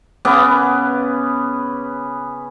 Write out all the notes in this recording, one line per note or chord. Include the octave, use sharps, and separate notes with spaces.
C#3 B3 B4 D6